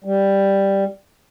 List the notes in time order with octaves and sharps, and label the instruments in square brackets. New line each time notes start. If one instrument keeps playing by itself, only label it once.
[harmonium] G3